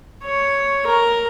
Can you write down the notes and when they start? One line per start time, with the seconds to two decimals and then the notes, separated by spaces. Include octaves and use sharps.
0.24 C#5
0.87 A#4